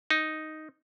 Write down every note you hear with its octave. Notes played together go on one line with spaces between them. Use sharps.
D#4